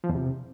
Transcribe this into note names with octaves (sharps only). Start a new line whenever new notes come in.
F3
E2
C3